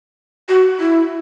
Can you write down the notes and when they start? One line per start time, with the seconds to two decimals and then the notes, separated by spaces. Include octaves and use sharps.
0.49 F#4
0.79 E4